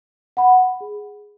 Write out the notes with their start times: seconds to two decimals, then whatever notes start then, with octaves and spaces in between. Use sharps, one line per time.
0.37 F#5 B5
0.81 G#4